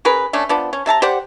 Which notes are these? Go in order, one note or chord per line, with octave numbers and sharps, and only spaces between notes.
C#4 G#4 A#4 B4
A3 C#4 D4
F3 B3 D4
C#4
C3 E5 A5 A#5
G4 C5 D5 F#5